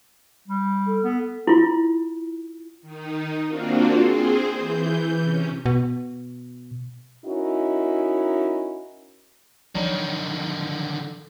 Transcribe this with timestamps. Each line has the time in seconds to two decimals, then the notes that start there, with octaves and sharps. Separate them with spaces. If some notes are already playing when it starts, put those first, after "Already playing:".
0.48 G3
0.87 A4
1.03 B3
1.47 E4 F4
2.82 D#3 D#4
3.47 A#3 C4 D4 F4 F#4
3.98 C4 G#4 C5
4.51 E3 G6
5.21 C3 C#4
5.66 B2
7.25 C#4 D#4 E4 F#4 A#4
9.75 D3 D#3 F3 F#3